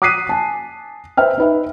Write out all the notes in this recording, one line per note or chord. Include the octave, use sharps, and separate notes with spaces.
D6 D#6 F#6 B6 C7 D#7
G#5 A5
B4 C5 E5 G5 F6
D#4 B4 E5